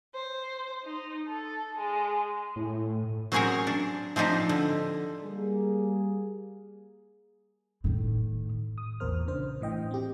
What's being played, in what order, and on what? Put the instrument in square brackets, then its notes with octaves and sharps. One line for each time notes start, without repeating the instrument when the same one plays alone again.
[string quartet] C5
D#4
A4
G#3
[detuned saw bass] A2
[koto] F#3 C4 C#4 G#4 A#4 C#5
D4
F3 C4 D4 D#4 G4
D3
[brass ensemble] G3 A#3 G#4
[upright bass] A2 D#3
[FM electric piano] D#6
A#1 E2 A#2 A#4 C5 F6
C#3 D4 C5
A2 E3 D#5 G5
C4 G4